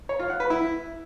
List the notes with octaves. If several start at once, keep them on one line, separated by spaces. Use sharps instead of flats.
C#5
F4
F#5
B4
E4